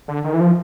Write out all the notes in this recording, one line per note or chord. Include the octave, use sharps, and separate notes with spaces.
D3
D#3
E3
F3